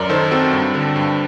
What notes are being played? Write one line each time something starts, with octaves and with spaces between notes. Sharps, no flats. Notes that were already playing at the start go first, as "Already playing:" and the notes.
Already playing: F#2 A#4 D5
D#3 A4 C5
C4 F#4 A4
G2
D3
G2